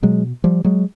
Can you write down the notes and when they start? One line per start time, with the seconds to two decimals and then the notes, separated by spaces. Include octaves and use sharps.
0.03 B2 F#3 G#3
0.44 F3 G3
0.65 F#3 G#3